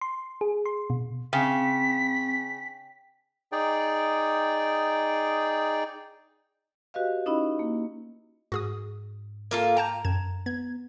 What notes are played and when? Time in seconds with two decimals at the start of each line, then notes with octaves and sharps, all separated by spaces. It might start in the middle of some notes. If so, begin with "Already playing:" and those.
0.01 C6
0.41 G#4
0.66 C6
0.90 B2
1.33 C#3 C4 G5 B6
3.52 D#4 G#4 D5 G5
6.94 F#4 G4 B4 D#5 F5
7.26 C#4 D#4 E4 D#5 B5
7.59 A#3
8.52 G#2 F#4 G#4 D#6
9.51 A#3 F4 A4
9.77 G5 A5 A#5 G6
10.05 F#2 G#6 E7
10.46 B3 G#6